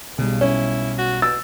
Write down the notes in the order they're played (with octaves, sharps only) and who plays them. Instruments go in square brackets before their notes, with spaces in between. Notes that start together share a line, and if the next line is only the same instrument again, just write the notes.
[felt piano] B1 G3 [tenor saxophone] C#3
[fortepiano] C#4 [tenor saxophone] E4
[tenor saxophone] F#4
[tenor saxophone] B2 [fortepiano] E6 [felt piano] A6